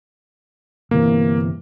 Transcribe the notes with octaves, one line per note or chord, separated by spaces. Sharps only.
G1 C3 E3 A#3